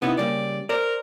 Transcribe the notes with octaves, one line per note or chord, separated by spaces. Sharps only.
C3 B3 D#4 E4
C#3 G3 A#3 D5
A#4 C5 D5